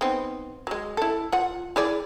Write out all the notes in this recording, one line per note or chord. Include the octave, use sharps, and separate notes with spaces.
B3 C4 D#4
F#3 G#3
E4 A4
F4 F#5
E4 G#4 D5